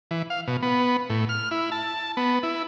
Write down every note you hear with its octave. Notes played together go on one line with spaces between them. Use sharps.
E3
F5
B2
B3
A2
F6
E4
A5
B3
E4